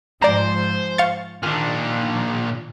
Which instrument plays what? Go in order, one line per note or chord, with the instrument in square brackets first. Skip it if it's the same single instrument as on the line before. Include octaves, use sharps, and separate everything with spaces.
[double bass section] G#2 F3 [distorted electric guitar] C5 [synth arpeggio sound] D5 A#5
[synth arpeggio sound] F5 C#6 A6
[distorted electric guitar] A#2 D4 [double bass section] D#3 [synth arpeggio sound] F6